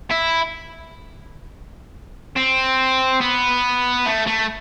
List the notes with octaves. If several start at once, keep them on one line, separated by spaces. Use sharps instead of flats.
E4
C4
B3
A3
A3